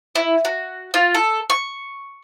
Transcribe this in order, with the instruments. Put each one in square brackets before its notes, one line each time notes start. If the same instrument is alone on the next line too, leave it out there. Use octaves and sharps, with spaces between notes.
[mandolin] E4
F#4
F4
A4
C#6